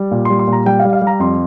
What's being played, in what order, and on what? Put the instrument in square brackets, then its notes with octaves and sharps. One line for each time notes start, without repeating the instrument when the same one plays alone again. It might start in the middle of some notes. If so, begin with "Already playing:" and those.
Already playing: [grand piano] G3
A#2
G3 C6
C6
A#2
A#5
G3 G5
F5
G3
F5
G3
A#5
F2 C6